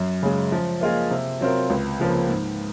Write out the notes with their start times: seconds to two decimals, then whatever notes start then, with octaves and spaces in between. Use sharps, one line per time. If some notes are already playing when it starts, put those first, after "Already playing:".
Already playing: F#2
0.23 C#3 G#3
0.52 F3
0.81 A#3 F4 G#4 D#5
1.11 C3
1.41 F#3 C4 F4 A#4
1.70 C#2
2.00 C#3 F3 A#3
2.29 G#2